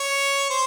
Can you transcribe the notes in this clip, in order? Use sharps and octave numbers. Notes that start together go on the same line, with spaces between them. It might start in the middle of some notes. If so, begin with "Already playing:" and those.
Already playing: C#5
C5